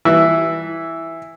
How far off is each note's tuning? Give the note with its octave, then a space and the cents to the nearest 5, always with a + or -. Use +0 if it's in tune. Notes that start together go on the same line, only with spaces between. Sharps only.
E3 -5 E4 +0